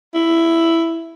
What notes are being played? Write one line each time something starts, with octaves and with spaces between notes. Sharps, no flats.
E4